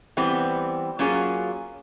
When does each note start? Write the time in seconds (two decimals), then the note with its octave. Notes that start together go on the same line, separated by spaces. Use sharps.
0.17 E3 G3 B3 C4
0.99 F#3 A#3 C#4 F4 G#4